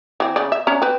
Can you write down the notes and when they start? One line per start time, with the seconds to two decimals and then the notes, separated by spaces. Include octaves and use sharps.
0.20 E3 C4
0.36 C#3 D5
0.52 E5
0.67 C#4 D4 A#5
0.82 C4 B4